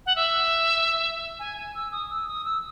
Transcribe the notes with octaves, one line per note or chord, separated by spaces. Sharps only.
F#5
E5
G#5
G#5
E6
D#6
E6
D#6
E6